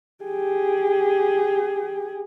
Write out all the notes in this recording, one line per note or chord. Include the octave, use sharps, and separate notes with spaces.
G4 G#4